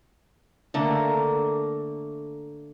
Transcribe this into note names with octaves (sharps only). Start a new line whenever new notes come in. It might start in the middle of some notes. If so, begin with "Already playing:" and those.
D3 A3 A#3